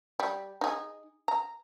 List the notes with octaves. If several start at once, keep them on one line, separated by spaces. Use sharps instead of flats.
G3
D#4 G#4
A#5